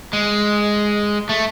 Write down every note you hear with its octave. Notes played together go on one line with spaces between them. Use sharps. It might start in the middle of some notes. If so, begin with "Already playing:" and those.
G#3
A3